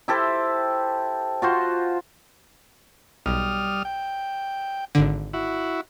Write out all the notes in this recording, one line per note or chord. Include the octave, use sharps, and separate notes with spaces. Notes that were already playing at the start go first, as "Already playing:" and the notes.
E4 G4 A4 C5
F4 F#4 C5
B1 G3 D#6 F6
G5
G#1 D3
E4 F#4